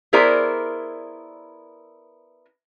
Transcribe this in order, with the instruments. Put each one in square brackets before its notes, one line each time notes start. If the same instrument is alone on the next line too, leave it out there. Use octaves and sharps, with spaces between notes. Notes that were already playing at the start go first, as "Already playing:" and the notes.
[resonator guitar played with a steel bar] B3 E4 G#4 A#4 C5 D5